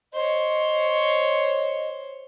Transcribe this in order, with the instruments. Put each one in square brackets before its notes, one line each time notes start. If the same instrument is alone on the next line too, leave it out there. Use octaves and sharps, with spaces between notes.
[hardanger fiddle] C5 C#5 [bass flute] D#5